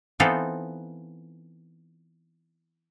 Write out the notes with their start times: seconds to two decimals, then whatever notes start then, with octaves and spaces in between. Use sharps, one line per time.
0.20 E3 B3 C4 D#4 F4 A4